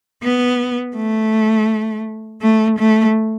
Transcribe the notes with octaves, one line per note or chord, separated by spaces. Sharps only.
B3
A3
A3
A3